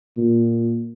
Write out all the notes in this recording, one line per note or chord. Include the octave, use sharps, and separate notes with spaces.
A#2